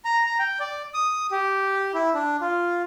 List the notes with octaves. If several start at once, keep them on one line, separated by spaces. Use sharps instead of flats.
A#5
A#5
G5
D5
D#6
G4
E4
D4
F4